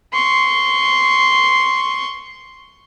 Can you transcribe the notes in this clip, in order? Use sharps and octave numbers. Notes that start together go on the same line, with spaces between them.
C6 C#6